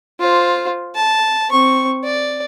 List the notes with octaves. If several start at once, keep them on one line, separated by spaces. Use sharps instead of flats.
F4 C5
A5
C4 C#6
D5